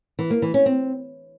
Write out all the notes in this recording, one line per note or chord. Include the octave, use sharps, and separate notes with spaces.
E3
A#3
E3
C#4
C4